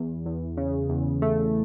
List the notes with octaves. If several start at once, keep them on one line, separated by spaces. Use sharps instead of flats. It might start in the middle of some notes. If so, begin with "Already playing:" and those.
Already playing: E2
E2
C#3
E2
A3